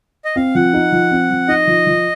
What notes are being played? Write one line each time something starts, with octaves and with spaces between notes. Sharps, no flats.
D#5
C4 F5
F3 F#5
D#4
F3
C4
F3
D#4 D#5
F3
F3